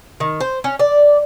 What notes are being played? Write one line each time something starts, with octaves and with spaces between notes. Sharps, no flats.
D#3
C5
C#4
D5